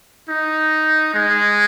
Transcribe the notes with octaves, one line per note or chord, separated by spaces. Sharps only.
D#4
G#3